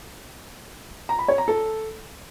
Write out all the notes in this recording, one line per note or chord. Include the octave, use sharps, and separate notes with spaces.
A#5
B5
C#5
A#5
A4